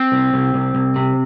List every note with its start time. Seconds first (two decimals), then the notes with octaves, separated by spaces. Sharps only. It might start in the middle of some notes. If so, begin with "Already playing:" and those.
Already playing: C4
0.12 C2
0.34 C2
0.54 C2
0.75 C2
0.96 C3